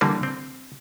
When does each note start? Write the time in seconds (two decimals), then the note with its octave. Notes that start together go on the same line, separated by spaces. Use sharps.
0.01 D3 E3 G3 A#3
0.23 C4